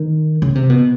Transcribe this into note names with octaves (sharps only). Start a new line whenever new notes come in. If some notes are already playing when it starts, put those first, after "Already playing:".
Already playing: D#3
C#3
C3
B2